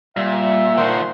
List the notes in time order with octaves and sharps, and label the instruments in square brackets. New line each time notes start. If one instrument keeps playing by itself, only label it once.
[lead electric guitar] A#2 [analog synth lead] G3 [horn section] E5
[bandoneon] A#2 C5 F#5 [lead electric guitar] D#3 F3 [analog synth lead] C6